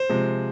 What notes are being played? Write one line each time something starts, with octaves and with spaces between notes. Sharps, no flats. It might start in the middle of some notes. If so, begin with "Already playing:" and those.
Already playing: C5
C3 F3 G#3